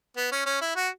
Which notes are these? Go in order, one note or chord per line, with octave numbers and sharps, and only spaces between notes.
B3
C#4
C#4
E4
F#4